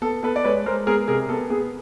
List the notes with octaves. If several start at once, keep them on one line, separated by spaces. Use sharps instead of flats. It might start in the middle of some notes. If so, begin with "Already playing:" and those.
B3 A4
B3 A4 B4
D5
G#3 B4 C#5
G#3 A#4 C5
B3 G#4 A#4
C3 G#4 A#4
B3 A4
B3 G#4